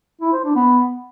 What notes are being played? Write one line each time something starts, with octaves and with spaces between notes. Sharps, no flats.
E4
C5
D4
B3